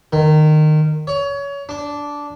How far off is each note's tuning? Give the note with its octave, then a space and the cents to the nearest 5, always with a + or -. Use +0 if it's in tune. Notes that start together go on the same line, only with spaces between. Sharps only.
D#3 -20
C#5 +25
D4 -10